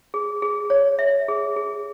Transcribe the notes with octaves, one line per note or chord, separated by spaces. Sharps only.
G#4
G#4
C#5
E5
G#4
G#4